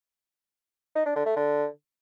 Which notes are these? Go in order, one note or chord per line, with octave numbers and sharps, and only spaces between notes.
D#4
D4
D3
A3
D3